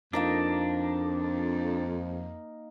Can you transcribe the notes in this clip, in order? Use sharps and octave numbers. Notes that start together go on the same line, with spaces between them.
F2 A#3 D4 D#4 A#4